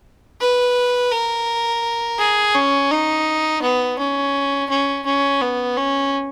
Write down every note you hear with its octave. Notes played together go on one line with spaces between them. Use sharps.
B4
A#4
G#4
C#4
D#4
B3
C#4
C#4
C#4
B3
C#4